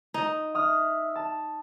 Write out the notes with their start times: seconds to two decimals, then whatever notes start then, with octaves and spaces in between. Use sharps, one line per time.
0.14 D#4
0.55 E5 D#6 F6
1.15 A5